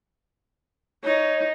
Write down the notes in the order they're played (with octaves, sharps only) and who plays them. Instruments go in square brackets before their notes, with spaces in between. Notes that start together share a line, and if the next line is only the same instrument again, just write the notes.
[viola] D#4 [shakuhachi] C#5